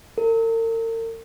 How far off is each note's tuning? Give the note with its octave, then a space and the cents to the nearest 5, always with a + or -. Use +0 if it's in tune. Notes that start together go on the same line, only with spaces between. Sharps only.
A#4 -45